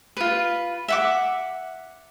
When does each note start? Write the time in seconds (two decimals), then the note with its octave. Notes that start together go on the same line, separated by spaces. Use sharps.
0.17 F4 B4
0.88 E5 F#5 D6